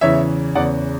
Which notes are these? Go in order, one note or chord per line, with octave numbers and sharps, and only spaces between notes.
E2 C#3 E3 C#5 E5
E2 C#3 E3 D5 F#5